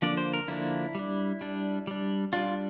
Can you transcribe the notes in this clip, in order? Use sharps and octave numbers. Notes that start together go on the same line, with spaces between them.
D3 F3 A#3 D4 D5
C5
A#4
D3 F3 A#3 D4 E4
G3 D4
G3 D4
G3 D4
G3 D4 F4